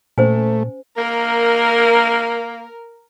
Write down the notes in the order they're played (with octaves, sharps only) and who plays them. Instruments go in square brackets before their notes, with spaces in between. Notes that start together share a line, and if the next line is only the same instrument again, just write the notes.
[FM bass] A#2 [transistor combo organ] A3 [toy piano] C#4 C5 G#5
[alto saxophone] A#3 [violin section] A#4